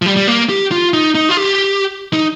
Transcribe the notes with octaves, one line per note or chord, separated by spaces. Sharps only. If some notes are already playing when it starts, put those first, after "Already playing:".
F3
G3
G3
A#3
G4
F4
D#4
D#4
F4
G4
D#4